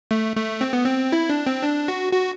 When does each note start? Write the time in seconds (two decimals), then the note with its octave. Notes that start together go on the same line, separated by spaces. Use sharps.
0.11 A3
0.36 A3
0.61 C4
0.73 B3
0.84 C4
1.12 E4
1.30 D4
1.46 C4
1.62 D4
1.88 F#4
2.13 F#4